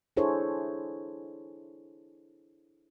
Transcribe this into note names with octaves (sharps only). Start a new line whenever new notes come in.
D4 E4 G#4 A4 C5 C#5